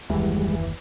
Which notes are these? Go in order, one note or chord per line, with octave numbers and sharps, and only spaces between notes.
F#1 D#2 E3 G3 G#3